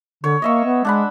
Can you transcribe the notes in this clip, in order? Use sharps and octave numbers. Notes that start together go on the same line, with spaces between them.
D3 C#5
A#3 D#5 E5 C#6
B3
G#3 D4 F#5 B5